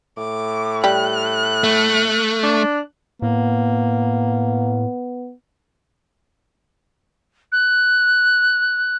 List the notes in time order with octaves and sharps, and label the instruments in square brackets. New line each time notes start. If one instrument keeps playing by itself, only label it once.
[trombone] A2 [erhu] D6
[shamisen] G3 [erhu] F#6
[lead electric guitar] A3
[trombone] D4
[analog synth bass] A2 [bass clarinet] A#3 [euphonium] B3
[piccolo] F#6